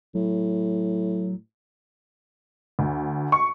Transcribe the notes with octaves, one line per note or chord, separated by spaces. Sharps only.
A2 F#3
D2
C#6